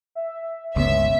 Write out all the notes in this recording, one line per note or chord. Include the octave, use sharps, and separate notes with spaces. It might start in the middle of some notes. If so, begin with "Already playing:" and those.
E5
G1 C#2 A#2 B3 C#4 E5